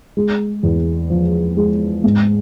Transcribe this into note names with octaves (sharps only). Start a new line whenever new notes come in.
G#3
E2
F3
G#3
G#2